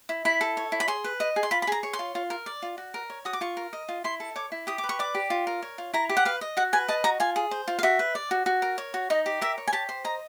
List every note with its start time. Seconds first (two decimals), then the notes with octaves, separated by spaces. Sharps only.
0.09 E4
0.25 E4 B5
0.41 A4
0.57 C#5
0.72 E4
0.80 B5
0.88 G#4 C6
1.04 B4
1.20 D#5
1.36 G#4
1.43 C6
1.51 F4 B5
1.62 B5
1.67 G#4 A#5
1.83 C#5
1.93 C6
1.99 F4
2.15 F4
2.30 A#4
2.46 D5
2.62 F4
2.78 F#4
2.94 A#4
3.10 C#5
3.25 F#4 D#6
3.33 D6
3.41 F4 C#6
3.57 A#4
3.73 D#5
3.89 F4
4.04 E4 C6
4.20 A4
4.36 C#5 D6
4.52 E4
4.67 G4 D#6
4.78 D6
4.84 B4
4.89 C#6
4.99 D5 D6
5.15 G4
5.30 F4
5.47 A#4
5.62 C#5
5.78 F4
5.94 E4 A#5
6.09 G4
6.17 F#5
6.25 B4 F5
6.41 D#5
6.57 F#4 F#5
6.73 B4 G#5
6.88 D#5 A5
7.04 F#4 A#5
7.20 F4 G#5
7.36 G#4
7.51 C5
7.68 F4
7.79 F5
7.83 F#4 E5
7.99 B4
8.15 D5
8.31 F#4
8.46 F#4
8.62 A#4
8.78 C#5
8.94 F#4
9.10 D#4 D#5
9.26 G4
9.41 A#4 E5
9.58 C#5
9.68 G#5
9.73 G4 A5
9.89 C5
10.04 D#5 A#5